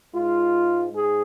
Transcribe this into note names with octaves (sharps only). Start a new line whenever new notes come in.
G#2 G#3 F4
G#2 G#4